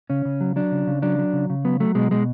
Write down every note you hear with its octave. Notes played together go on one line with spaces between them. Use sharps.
C#3 C#4
C#3
F#3
F#3 D4
C#3
C#3
F#3 D4
F#3
C#3
C#3
F#3 B3
F#3 A3
B2 G#3
B2 G#3